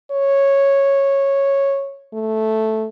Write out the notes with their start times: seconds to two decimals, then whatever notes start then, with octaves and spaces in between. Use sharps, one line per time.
0.12 C#5
2.13 A3